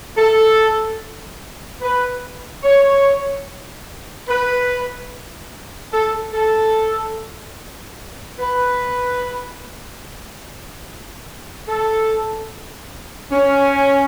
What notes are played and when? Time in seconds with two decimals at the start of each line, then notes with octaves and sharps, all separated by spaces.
0.18 A4
1.81 B4
2.63 C#5
4.28 B4
5.92 A4
6.33 A4
8.39 B4
11.67 A4
13.31 C#4